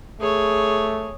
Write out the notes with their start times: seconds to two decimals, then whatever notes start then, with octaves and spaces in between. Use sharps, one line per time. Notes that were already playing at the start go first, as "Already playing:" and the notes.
0.21 A3 G#4 C#5